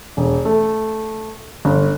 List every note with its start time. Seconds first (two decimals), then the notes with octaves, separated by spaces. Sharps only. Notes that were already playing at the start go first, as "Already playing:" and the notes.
0.17 E1
0.45 A3
1.65 G1